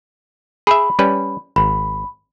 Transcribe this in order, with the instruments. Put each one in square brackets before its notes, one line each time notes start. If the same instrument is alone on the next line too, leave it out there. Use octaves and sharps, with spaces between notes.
[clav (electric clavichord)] G#4 E5 [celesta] B5
[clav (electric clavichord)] G3 C#4 B4
[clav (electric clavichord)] G#1 [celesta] B5